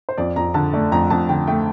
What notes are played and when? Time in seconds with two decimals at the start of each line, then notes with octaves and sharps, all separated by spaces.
0.09 C5
0.18 F2 D5
0.36 F2 A#5
0.54 D3 A5
0.73 A3 D5
0.92 F2 A#5
1.10 F2 A5
1.29 D3 G5
1.47 A3 G5